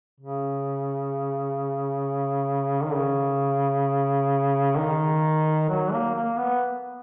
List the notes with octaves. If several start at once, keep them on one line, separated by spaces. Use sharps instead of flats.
C#3
D#3
C#3
D#3
F#3
A#3
A#3
B3